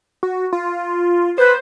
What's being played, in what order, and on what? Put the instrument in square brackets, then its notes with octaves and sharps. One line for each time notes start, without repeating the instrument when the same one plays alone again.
[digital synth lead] F#4
F4
[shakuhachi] B4 [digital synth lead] C5